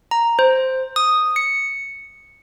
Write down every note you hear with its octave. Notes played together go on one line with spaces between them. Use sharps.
A#5
C5
D#6
C#7